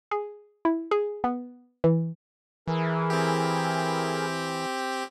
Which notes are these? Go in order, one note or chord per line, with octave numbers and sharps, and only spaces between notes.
G#4
E4
G#4
B3
E3
E3 E4 G#4 A#4
C4 G4